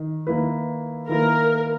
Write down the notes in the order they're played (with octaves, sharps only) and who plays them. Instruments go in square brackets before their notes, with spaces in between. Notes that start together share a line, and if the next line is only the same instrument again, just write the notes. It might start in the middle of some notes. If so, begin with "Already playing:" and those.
Already playing: [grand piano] D#3
D#3 A#3 E4 B4
[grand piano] D#3 A#3 E4 B4 [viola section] A#4